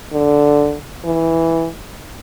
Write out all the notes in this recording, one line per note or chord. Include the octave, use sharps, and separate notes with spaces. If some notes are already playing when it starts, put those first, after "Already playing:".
D3
E3